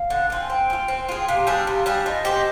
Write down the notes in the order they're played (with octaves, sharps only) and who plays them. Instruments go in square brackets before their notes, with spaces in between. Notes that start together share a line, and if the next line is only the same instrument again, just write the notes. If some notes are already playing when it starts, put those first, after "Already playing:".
Already playing: [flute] F5
[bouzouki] D3
F3 C4
[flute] G#5
[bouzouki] C4 [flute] G5
[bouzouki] G#4
F4
C4
F4 G#4
[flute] G5
[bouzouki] C3 [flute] F5
[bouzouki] G3 D4 G#4
C3
G3 D4 G#4
[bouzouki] F3 [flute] D#5
[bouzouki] C4 G4